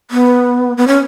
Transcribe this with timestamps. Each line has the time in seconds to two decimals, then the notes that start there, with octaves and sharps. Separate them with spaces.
0.11 B3
0.77 B3
0.87 C#4